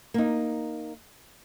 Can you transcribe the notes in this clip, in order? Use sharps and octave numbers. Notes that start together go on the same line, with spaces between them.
A#3 D#4